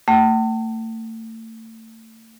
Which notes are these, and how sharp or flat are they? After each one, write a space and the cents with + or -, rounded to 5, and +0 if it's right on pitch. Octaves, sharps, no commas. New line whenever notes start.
A3 +35 G5 -45